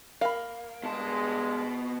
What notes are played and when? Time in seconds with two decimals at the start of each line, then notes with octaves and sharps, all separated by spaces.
0.21 A#3 F5 B5
0.84 G2 B2 G#3 A5